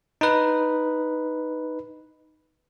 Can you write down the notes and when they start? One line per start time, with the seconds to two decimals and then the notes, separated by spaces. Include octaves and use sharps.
0.21 D#4 B4